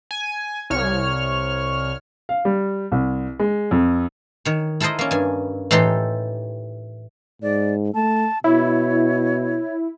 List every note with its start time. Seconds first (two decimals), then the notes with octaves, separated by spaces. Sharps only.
0.11 G#5
0.70 C2 C#5 F6
2.29 F5
2.45 G3
2.92 C2
3.39 G#3
3.71 F2
4.45 D#3 C#5
4.80 E4 A4 A#4 C5 D#5
4.99 A#3 C#4
5.11 G2 G#5
5.71 A2 E3 D#4 G4 A4 C6
7.42 G#2 D5
7.94 A3 A5
8.44 B2 E4 C#5